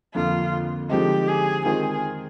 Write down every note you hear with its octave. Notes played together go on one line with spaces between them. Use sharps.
F2 D3 F3 A#3 F4
D3 F3 G#3 C4 D#4 G4
G#4
D#3 G#3 C4 F4 G#4 A#4